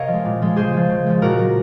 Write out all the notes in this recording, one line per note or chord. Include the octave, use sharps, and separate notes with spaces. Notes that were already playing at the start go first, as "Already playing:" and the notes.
Already playing: C3 A#4 C#5 D#5 F5
F3
G#3
A#2
F3 G#3
C#3 G#4 C5
F3 G#3
C#3
F3 G#3
A#2 F#4 A#4
F#3